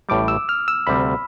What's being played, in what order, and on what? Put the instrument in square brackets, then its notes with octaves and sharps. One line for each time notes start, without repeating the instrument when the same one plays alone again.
[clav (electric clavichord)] A1 A2 G3 [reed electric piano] D6
[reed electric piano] E6
F6
E6
[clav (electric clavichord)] D2 C3 G3 C4 [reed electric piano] B5